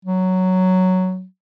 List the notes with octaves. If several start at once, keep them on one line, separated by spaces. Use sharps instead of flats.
F#3